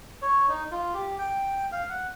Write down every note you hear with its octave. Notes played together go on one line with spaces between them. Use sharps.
C#5
D#4
F4
G4
G5
F5
F#5